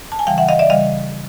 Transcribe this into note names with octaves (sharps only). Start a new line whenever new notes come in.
A5
G#5
C#3 E3 G3 F5 G5
E5 F#5
D#5 F5
D5 E5
C#3 E3 G3 D#5 F5